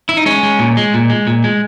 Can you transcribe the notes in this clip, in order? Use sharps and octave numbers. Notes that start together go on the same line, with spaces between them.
E4
D#4
G#3 C#4
G#3
A#2
G#3
A#2
G#3
A#2
G#3